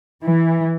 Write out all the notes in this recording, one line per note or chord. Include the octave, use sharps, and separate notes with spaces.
E3